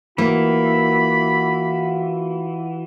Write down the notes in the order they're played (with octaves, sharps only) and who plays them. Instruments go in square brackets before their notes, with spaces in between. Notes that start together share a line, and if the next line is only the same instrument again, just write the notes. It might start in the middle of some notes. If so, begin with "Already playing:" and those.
[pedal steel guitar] E3 [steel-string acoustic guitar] A#3 [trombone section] F4 F#4 [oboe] B5